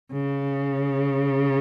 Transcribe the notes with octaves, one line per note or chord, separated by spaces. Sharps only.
C#3